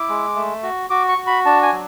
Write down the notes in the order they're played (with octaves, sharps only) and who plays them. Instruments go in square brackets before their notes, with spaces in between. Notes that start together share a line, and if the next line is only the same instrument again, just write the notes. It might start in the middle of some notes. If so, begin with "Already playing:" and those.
Already playing: [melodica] E4 D6
G#3
A3
F#4
F#4 D6
C#6
F#4
B5
D4 A5
G#5
F#3